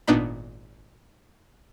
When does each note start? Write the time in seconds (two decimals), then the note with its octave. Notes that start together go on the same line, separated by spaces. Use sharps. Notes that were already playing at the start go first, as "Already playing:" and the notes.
0.07 G#1 A#2 B3 D4 D#4 B5